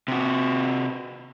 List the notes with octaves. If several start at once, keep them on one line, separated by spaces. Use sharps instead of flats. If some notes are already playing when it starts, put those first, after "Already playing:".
C3 F#4